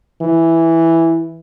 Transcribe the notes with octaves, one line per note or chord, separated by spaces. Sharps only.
E3